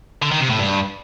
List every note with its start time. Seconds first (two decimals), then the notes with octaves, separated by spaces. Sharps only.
0.22 D3
0.31 D#3
0.41 C3
0.50 A2
0.59 G2